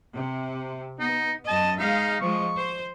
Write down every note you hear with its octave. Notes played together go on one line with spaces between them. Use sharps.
C3
B3 D#4
F#2 D#5 A5
G#3 D#4 F5
F3 G#3 C#6
C5